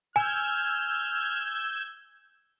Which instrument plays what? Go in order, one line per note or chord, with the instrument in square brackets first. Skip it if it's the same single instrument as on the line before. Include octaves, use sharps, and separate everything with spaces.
[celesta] G#5 [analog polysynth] E6 G6 G#6 [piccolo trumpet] F6